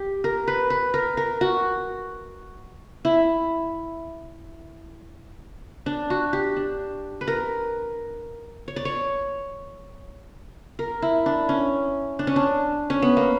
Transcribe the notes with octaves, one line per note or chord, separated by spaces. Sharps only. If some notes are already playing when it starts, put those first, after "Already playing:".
Already playing: G4
A#4
B4
B4
A#4
A#4
F#4
E4
D4
F#4
G4
D4
B4
A#4
C#5
D5
C#5
A#4
E4
D4
C#4
D4
C#4
D4
C#4
B3
A#3